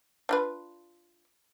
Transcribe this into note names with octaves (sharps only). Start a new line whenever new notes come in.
D4 F4 B4